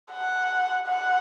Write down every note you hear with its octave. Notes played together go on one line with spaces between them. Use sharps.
F#5
F#5